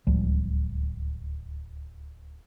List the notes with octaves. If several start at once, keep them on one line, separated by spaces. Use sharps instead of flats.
D1 C#2 F3 G3